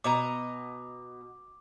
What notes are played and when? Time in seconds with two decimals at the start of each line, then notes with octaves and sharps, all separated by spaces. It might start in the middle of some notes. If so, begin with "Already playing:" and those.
0.04 B2 D#5 A#5 D6